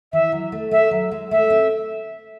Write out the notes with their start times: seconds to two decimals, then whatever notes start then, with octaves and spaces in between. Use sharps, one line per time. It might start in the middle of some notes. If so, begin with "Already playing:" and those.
0.13 E3 E5
0.32 F#3
0.52 A3
0.71 A3 E5
0.91 F#3
1.11 G#3
1.31 A3 E5
1.50 C4